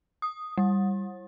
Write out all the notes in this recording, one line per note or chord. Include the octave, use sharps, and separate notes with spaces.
D#6
G3